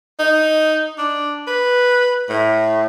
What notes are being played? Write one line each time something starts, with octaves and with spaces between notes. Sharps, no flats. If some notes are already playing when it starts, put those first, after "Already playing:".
D#4
D4
B4
A2